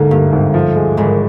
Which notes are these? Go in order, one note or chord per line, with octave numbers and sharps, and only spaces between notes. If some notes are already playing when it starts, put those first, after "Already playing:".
Already playing: D2 G#2 D3 A#3
G2 A#3
G#1
F3
G#3
G#1 G#2 G#3